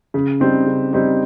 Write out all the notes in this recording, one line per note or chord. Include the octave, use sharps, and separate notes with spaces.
C#3
G3 C4 D#4
C#3
G3 C4 D#4